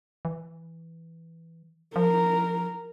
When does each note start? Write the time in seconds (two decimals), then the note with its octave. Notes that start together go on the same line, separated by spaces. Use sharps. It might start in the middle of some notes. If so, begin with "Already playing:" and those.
0.25 E3
1.96 F3 A#4